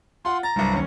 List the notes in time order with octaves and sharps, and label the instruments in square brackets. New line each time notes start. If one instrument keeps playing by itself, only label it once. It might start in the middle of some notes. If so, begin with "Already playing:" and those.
[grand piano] F4 F#5 [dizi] C6
[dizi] A#5 [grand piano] A6
[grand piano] C2 G2 [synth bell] F#3 G3 C#7
[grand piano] D#2 C#4